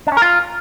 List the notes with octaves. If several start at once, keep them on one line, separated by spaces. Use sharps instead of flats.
D4
C#4
A#4
F4